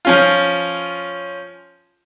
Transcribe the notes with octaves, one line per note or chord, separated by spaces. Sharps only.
F3 C#4 F4